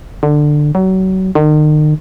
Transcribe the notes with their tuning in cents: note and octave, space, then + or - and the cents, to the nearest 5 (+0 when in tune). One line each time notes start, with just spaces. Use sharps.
D3 +15
F#3 +30
D#3 -40